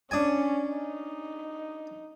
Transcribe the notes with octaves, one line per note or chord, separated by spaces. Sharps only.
C#4 D4 G#5
D#4